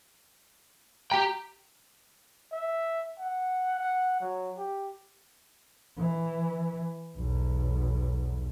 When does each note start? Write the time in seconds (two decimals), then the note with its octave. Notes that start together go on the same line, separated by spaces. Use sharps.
1.11 G4 G5 A#5
2.52 E5
3.19 F#5
3.79 F#5
4.21 F#3
4.57 G4
5.98 E3
7.17 B1 E2